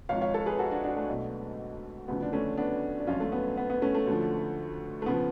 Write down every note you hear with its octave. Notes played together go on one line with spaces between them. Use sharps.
G#1 G#2 F3 C#5 F5
C#5 F5
A4 C#5
G#4 B4
F#4 A4
D4 F#4
D4 F#4
A3
B1 B2
D2 C#3 F3 B3
D4
A3 C#4
B3 D4
D4
G#1 F#2 F3 C#4 F4
A3
B3
B3
B3
A3 C#4
A3
D2 D3 F3
A3
C#3 F3 B3